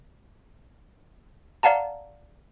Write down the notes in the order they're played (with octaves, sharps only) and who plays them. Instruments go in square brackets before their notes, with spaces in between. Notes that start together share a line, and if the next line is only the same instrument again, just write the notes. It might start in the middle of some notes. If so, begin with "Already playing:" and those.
[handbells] D5 F5 F#5 A5 A#5